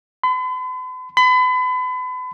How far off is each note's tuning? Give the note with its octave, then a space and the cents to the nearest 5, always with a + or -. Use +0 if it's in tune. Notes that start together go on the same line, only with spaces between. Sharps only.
B5 +45
B5 +35